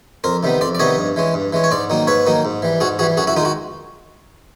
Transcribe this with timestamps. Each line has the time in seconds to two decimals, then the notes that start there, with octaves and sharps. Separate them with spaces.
0.24 F2 A#4 C5
0.43 C3 D#3 G3 B3
0.61 F2 C5 D5
0.75 D5
0.79 C3 D#3 G3 B3 C#5 D#5
0.98 G2
1.16 E3 G#3 C#4
1.34 G2
1.53 E3 G#3 C#4
1.64 C#5
1.71 G#2 C5 D5
1.90 D#3 F#3 A#3 D#4
2.07 G#2 B4 C#5
2.26 D#3 F#3 A#3 D#4
2.45 G#2
2.62 E3 G3
2.80 G#2 F#4 G#4
2.99 E3 G3 F#4 G#4
3.17 F#2 F#4 G#4
3.27 E4 F#4
3.36 D#3 D#4 F4
3.40 G#3 F#4